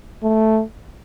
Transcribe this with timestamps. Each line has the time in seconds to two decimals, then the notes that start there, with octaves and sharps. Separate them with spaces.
0.23 A3